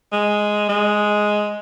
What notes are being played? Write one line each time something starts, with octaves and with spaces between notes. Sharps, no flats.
G#3
G#3